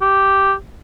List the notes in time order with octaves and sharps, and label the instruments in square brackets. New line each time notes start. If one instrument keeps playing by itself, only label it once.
[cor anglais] G4